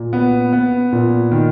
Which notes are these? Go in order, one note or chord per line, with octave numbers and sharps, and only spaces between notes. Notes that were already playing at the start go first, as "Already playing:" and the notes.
Already playing: A#2
B3
B3
A#2
D#3